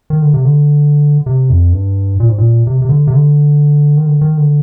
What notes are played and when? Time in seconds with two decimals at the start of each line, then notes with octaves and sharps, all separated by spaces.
0.10 D#3
0.22 D3
0.34 C3
0.45 D3
1.26 C3
1.50 F2
1.73 G2
2.20 A#2
2.29 G#2
2.38 A#2
2.67 C3
2.82 C3
2.89 D3
3.07 C3
3.13 D3
3.97 D#3
4.06 D3
4.21 D#3
4.37 D3